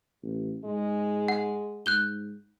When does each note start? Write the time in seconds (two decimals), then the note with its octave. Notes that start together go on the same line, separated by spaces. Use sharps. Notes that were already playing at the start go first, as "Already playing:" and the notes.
0.23 A1
0.65 G#2 G#3
1.28 F#5
1.86 G#2 F#6 G6 G7